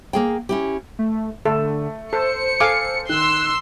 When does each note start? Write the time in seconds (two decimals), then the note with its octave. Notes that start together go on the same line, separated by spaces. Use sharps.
0.13 A#3 G#4 G5
0.49 C#4 E4 G4
0.99 A3
1.45 D3 A3 A4
2.13 A4 C5 C#7
2.60 A4 C5 F5 G#5 D6
3.09 D#3 C6 E6 F#6